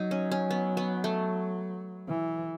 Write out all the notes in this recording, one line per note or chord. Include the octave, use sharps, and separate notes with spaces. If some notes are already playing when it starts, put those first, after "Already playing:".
Already playing: F#3 D#4
C#4
C#4
B3
B3
A3
E3